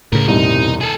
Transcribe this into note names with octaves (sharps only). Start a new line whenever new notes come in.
C#2 A2 C#3 A#4
E1 C2 G2 C3 D#4
G#4 A4